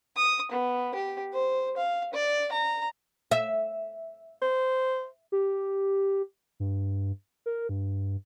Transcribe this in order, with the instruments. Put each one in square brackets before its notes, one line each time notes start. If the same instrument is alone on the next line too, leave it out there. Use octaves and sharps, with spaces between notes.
[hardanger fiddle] D#6
B3
G4
C5
F5
D5
A#5
[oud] E5
[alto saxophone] C5
[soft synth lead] G4
G2
A#4
G2